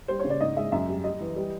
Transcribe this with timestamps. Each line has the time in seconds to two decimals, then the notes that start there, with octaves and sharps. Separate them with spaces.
0.08 G3 C5
0.20 C#3 C#5
0.30 D5
0.40 G#2 D#5
0.56 G#3 E5
0.72 F#2 E5
0.88 G3
1.04 G3 D#5
1.20 E3
1.36 G3